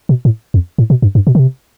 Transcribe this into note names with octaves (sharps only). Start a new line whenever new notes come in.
B2
A2
F2
A2
B2
G2
G2
B2
D3
C3